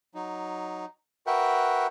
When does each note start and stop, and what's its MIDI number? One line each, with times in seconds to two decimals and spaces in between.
0.15 0.85 54
0.15 0.85 63
1.27 1.87 66
1.27 1.87 70
1.27 1.87 71
1.27 1.87 76
1.27 1.87 78
1.27 1.87 79